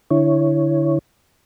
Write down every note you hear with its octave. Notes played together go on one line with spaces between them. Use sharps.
D3 E4 C#5